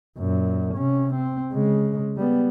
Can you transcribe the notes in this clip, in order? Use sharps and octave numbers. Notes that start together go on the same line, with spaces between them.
F#2 A#2
C3 C#4
C4
C#3 G#3
G3 B3